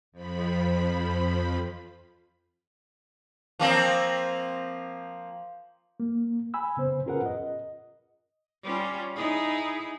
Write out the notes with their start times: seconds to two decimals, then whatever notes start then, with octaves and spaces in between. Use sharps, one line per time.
0.12 F2 F3 B5
3.59 F3 A#3 C4
6.00 A#3
6.54 G#5 B5 E6
6.77 C#3 B3 C5
7.06 C#4 F4 G#4 A#4 B4 F#5
7.26 D#5
8.63 G3 C#4 F4
9.16 D#4 E4 G#4